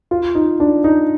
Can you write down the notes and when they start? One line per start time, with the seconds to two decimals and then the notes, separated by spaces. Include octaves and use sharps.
0.11 F4
0.35 D#4
0.60 D4
0.84 D#4